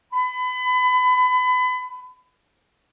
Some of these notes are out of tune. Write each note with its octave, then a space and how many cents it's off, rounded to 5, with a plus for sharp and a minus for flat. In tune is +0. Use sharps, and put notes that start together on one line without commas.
B5 +30